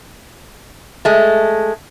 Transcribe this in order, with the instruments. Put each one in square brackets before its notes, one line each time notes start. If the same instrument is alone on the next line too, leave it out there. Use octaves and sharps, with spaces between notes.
[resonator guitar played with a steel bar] G#3 A3